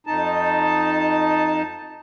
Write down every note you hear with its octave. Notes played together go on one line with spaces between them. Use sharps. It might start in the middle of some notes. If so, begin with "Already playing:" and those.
F2 D#4 A5